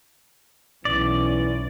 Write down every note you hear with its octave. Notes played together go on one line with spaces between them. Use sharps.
B1 E3 C#4 D5